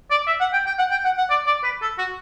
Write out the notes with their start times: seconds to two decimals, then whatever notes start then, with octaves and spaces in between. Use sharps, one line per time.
0.10 D5
0.27 E5
0.40 F#5
0.53 G5
0.66 G5
0.79 F#5
0.91 G5
1.05 F#5
1.18 F#5
1.30 D5
1.46 D5
1.63 B4
1.82 A4
1.98 F#4